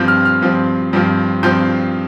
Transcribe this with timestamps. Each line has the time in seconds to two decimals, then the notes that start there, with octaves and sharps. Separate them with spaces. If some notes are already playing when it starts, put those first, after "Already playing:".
Already playing: G2 F3 C4 F4 G6
0.08 F6
0.25 F6
0.42 G2 F3 C4 F4
0.93 G2 F3 C4 F4
1.43 G2 F3 C4 F4 G6